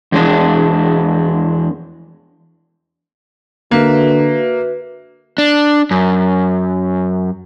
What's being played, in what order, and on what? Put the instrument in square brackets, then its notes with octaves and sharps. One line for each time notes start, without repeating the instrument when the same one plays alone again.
[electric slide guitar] E2 G#3 D4
[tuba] D3 [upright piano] A#3 [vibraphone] F#4 B4 E5
[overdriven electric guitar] D4
F#2